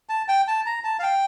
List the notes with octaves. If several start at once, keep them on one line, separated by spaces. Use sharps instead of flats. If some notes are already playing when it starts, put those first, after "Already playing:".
A5
G5
A5
A#5
A5
F5
G5